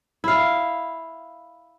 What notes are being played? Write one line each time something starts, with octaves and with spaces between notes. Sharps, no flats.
E4 F5